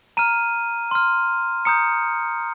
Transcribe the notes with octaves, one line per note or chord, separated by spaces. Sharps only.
A#5 F6 D#7
C6 F6
A#5 D#6 G6 C#7